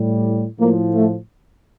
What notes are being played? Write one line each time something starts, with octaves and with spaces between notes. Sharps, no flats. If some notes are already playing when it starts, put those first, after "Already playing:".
Already playing: A2 G3
A2 F3 A#3
A3